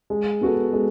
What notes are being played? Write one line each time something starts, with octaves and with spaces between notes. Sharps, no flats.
G#3
B3 F#4 A4
G#3